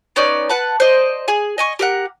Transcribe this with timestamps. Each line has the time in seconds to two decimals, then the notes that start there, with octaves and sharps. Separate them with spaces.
0.16 B3 C#4 D#4 D5
0.50 B4 F#5 A5
0.80 C5 D5 D#5
1.28 G#4 G#5
1.58 D#5 G#5 C#6
1.79 G4 A#4 F#5